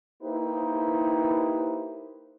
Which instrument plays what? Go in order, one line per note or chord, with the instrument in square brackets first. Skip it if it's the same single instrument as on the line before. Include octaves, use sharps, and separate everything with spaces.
[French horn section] A#3 D#4 E4 G4 B4 C5